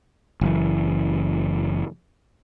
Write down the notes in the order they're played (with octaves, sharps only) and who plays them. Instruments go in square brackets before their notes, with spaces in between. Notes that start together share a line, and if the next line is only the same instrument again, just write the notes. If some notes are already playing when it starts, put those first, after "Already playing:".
[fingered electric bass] F#1 E3